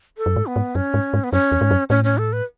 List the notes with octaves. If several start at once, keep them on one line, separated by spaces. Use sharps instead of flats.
A4
F#2
G#2
B3
G#2
F#2 C#4
G#2
G#2
B3
F#2 C#4
E2
G#2
F#2
A2 C#4
C#4
A4
B4